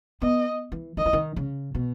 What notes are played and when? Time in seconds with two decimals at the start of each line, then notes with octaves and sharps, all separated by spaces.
0.22 B3 D#5
0.72 E3
0.97 D#3 D#5
1.06 E3
1.13 D#3
1.36 C#3
1.75 B2